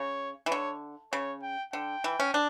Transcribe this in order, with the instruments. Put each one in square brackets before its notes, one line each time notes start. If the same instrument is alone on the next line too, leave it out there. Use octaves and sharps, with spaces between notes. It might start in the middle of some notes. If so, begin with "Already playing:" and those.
Already playing: [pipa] C#3 [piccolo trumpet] C#5
[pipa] E3
[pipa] D3 [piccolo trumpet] C#5
[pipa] C#3 [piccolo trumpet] C#5
[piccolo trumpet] G5
[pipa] D3 [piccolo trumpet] G5
[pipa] E3
C#4
D4